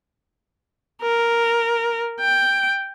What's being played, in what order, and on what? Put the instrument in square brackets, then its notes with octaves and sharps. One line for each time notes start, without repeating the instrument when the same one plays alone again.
[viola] A#4
G5